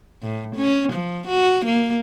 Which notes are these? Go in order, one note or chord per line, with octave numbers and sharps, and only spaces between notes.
A2
C#4
F3
F#4
A#3